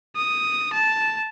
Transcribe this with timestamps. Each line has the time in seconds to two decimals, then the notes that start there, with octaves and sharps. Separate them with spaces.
0.16 D#6
0.73 A5